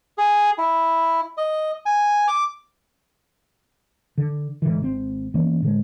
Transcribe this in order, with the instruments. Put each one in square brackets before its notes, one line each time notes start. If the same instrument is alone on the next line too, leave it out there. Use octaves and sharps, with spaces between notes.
[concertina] G#4
E4
D#5
G#5
D6
[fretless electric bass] D3
G#2 D3 E3
G#1 B2 C4
E3 A#3 B3 C#4
A2 D3 G#3